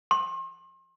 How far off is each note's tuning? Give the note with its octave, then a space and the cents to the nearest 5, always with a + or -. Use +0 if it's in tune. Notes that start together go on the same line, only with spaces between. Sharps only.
C6 +40